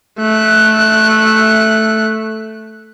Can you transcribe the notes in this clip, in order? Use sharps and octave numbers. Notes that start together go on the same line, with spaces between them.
A3 F#6